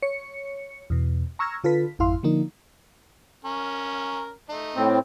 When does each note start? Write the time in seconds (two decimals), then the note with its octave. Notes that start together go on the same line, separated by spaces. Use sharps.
0.02 C#5 C#7
0.90 E2 B2
1.39 A#5 C#6 E6 F6 G#6 A#6
1.64 D3 F4 A4 B4 B6
1.99 G#1 F2 E4 F5 C6
2.23 D3 F3 A#3 D#4
3.45 C#4 A#4
4.49 A3 D#4
4.75 A2 C4